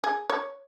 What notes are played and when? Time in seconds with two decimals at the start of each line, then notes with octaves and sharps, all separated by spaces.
0.04 G#4
0.30 C#5